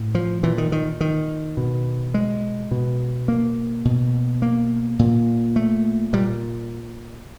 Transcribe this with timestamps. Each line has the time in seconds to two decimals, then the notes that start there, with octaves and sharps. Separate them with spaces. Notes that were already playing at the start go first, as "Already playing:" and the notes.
Already playing: A2
0.15 F3
0.43 A#2 E3
0.58 D#3
0.72 D#3
1.01 D#3
1.57 B2
2.14 G#3
2.71 B2
3.28 A#3
3.85 B2
4.42 A#3
4.99 A#2
5.56 A3
6.13 A#2 G3